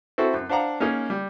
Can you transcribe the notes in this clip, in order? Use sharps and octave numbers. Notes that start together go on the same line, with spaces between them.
C4 E4 F#4 A4
F#2
D4 C5 F5 F#5 A#5
A#3 C#4 D#4 G#4
G3